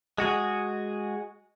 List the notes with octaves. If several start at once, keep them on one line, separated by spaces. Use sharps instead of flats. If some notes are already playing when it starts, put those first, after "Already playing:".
G#3 F#4 G#4